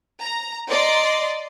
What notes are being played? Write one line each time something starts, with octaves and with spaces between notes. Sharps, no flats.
A#5
D5 D#5 A#5 C6